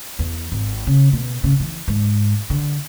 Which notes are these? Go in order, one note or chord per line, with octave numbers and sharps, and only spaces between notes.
E2
G#1
C#3
B2
C#3
E3
G#2
D3